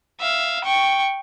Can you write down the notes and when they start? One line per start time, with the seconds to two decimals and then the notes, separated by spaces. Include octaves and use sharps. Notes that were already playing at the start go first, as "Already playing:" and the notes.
0.20 E5 F5
0.64 G5 C#6